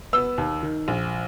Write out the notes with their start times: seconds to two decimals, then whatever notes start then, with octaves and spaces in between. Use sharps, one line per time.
0.13 B3 E6
0.38 D#2
0.63 D#3
0.88 A#1